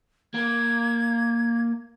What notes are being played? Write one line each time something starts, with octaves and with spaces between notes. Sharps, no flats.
A#3 G#6